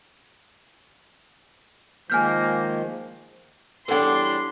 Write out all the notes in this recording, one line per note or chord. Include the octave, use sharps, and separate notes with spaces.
D#3 F3 G#3 A#3 G#5 F6 G6
E2 G3 D4 A4 C#5 F#5 C6